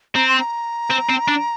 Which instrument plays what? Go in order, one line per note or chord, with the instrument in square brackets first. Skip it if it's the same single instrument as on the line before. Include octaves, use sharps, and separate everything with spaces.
[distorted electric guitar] C4 [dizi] A#5
[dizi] C6
A#5
[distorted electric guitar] C4
C4
D4